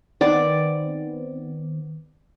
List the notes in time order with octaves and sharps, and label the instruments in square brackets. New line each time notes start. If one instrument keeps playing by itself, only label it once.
[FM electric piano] D#3 B3 C4 [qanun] D5